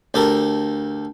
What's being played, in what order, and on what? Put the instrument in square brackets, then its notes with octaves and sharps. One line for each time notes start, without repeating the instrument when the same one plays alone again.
[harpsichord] D2 G4 A4 A#4